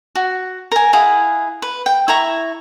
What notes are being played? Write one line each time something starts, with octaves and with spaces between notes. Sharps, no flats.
F#4
A#4 G#5
E4 G#4 F5 F#5
B4
G5
E4 E5 A#5 C#6